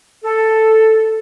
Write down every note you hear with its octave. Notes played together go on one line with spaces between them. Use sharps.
A4